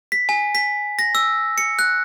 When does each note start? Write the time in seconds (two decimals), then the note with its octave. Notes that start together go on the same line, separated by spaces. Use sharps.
0.12 B6
0.29 G#5
0.55 B6
0.99 A#6
1.15 E6
1.58 C#7
1.79 F#6